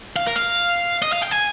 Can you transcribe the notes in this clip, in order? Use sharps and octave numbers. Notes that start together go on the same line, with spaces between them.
F5
A#4
F5
D#5
F5
G5
G#5